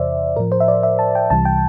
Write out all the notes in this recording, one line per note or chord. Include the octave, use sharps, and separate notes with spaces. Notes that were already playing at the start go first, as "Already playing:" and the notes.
Already playing: E2 C3 E3 C5 D5 E5
A2 F3 A#4
C5
E5
D5
E5
A5
G5
C2 C3 E3 G3 A5
G5